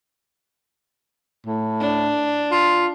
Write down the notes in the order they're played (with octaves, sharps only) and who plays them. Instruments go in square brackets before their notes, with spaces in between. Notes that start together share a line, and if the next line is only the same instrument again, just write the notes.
[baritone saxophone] A2
[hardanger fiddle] D4
[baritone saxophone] F4